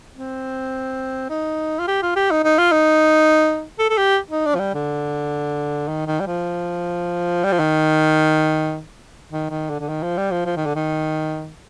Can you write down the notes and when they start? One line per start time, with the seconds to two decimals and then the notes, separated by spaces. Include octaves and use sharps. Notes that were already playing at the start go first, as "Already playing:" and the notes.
0.16 C4
1.30 D#4
1.79 F4
1.88 G4
2.02 F4
2.16 G4
2.31 D#4
2.44 D#4
2.58 F4
2.71 D#4
3.79 A4
3.90 A4
3.97 G4
4.31 D#4
4.45 D4
4.55 F3
4.59 G3
4.74 D3
5.88 D#3
6.07 D#3
6.20 G3
6.27 F3
7.44 G3
7.52 F3
7.59 D#3
9.31 D#3
9.50 D#3
9.69 D3
9.79 D3
9.88 D#3
10.03 F3
10.17 G3
10.31 F3
10.45 F3
10.56 D#3
10.65 D3
10.75 D#3